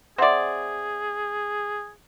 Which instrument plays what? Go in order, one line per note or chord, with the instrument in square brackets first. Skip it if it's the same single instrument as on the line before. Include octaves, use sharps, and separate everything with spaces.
[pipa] C4 D5 [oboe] G#4 [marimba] E5 F#5 C6